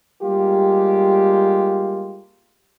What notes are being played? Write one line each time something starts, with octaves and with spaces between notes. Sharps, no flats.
G3 G#3 A#3 F4 G4